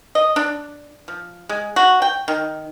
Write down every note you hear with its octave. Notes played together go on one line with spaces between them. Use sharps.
D#5
D4
F3
G#3
F#4
G5
D#3